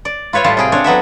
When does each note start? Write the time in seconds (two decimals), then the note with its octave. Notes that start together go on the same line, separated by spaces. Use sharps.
0.05 D5
0.33 F4 B4 C#5 E5 F5
0.44 A2 G3 F4 A5
0.57 C3 G#4 G5
0.72 C4 D4 C#5
0.84 F#3 B3 A4 E5